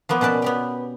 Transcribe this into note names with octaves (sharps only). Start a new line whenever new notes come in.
F3 A#3 B3
B2 C#4 B4 D5 A5
B3 G4 G5